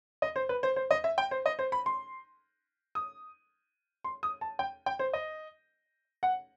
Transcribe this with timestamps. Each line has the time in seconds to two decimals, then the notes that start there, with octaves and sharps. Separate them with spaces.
0.22 D#5
0.36 C5
0.49 B4
0.63 C5
0.76 C5
0.91 D#5
1.04 E5
1.18 G5
1.31 C5
1.46 D#5
1.59 C5
1.72 B5
1.86 C6
2.95 D#6
4.04 C6
4.23 D#6
4.41 A5
4.59 G5
4.86 G5
4.99 C5
5.13 D#5
6.23 F#5